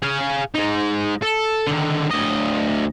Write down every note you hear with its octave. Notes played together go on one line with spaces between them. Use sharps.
G#4 F5
G#3 D#4
A4
D3 D#3
D2 D#5